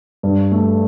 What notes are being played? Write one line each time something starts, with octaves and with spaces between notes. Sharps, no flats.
G2
A3